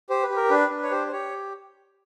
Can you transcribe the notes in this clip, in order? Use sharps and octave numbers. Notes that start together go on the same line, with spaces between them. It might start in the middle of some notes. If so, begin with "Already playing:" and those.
G4 C5
B4
G4
A#4
D4 B4
D4
C#5
G4 C5
C5
G4 C#5